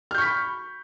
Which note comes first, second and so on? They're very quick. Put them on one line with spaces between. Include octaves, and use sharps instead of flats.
F6 G6 C#6 B6 B5